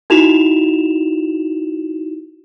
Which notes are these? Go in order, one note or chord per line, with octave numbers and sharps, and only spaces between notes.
D#4 E4 F#4 E7 F7